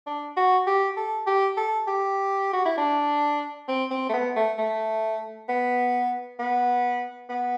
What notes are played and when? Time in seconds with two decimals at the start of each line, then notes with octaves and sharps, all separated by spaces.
0.06 D4
0.37 F#4
0.67 G4
0.97 A4
1.27 G4
1.57 A4
1.87 G4
2.53 F#4
2.65 E4
2.78 D4
3.68 C4
3.91 C4
4.09 A3
4.13 B3
4.36 A3
4.58 A3
5.49 B3
6.39 B3
7.29 B3